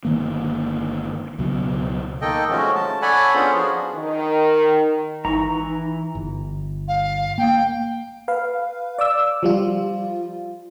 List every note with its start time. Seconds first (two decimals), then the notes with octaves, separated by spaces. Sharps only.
0.05 G1 D#3 A#3
1.39 C#2 B2 F#3
2.22 D#3 A#3 A4 D#5 G5
2.50 F3 G#3 A3 C#4 F#4
2.75 A5
3.02 A4 C#5 D5 F#5 G#5 B5
3.35 B3 C#4 D4 F4 G#4 C5
3.54 F3 D4 F#4 G#4
3.95 D#3
5.25 G#1 E3 D#4 A#5 C#6
6.15 G1
6.88 F5
7.38 A#3 G5
8.28 B4 F5
8.98 D5 D6 E6
9.43 F3 G3 F4